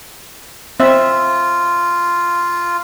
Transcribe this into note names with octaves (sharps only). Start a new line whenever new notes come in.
C4 F4 E5